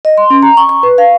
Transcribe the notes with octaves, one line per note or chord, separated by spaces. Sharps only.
D#5
C6
C#4
A#5
C#6
C#6
B4
F5